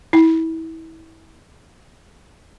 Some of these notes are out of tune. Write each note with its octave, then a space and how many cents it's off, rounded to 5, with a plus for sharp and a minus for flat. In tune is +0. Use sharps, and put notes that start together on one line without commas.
E4 -25